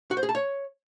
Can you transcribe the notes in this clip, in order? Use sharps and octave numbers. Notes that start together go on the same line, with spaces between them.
F#4
C5
G#4
A5
C#5